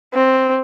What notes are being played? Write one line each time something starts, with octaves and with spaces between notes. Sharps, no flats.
C4